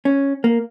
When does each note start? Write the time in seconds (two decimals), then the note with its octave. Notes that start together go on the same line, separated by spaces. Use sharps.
0.05 C#4
0.44 A#3